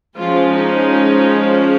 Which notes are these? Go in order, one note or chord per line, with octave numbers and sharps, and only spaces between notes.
F3 G#3 C#4 F4
D#4